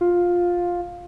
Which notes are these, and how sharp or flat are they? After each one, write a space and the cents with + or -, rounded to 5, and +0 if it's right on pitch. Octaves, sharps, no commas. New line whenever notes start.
F4 +10